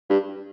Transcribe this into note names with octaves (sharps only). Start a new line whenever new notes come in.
G2